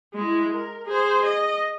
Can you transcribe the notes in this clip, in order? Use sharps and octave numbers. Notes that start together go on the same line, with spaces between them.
G#3 E4
A#4
G#4 C5
D#5